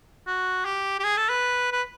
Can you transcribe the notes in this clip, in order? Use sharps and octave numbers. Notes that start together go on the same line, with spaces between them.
F#4
G4
G4
G#4
A4
B4
B4